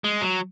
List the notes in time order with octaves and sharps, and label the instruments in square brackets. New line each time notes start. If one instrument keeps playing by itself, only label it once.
[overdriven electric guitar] G#3
F#3